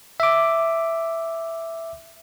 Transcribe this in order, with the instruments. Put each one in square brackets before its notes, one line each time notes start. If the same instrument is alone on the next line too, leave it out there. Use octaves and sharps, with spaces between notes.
[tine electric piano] E5 D6